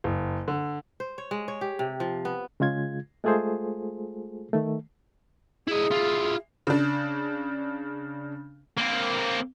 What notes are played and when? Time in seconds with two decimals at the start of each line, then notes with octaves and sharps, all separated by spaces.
0.04 F#1
0.48 D3
1.00 C5
1.18 C#5
1.31 G#3
1.48 C#5
1.61 G4
1.79 C3
2.00 F3
2.25 B3
2.60 C#3 G#3 F4 G#6
3.24 G#3 A3 F4 G#4 A4 C5
4.53 D#3 A3
5.68 E4 G#4 D#5
5.92 E4 F4
6.67 C#3 D4
8.78 A#3 C4